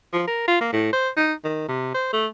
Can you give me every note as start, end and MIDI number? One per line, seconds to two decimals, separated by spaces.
0.13 0.27 53
0.27 0.43 70
0.48 0.60 65
0.61 0.73 58
0.73 0.90 45
0.93 1.09 72
1.17 1.33 63
1.44 1.67 51
1.69 1.91 48
1.94 2.12 72
2.13 2.27 57